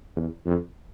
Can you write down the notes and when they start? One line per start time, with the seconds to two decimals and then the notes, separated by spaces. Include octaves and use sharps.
0.16 E2
0.46 F2